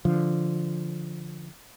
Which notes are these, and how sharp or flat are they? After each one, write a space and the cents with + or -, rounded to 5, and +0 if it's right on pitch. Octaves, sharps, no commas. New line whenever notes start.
D3 -5 F3 -10